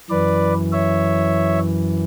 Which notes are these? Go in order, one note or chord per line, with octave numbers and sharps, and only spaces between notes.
F#2 E3 B4 D5
C#5 E5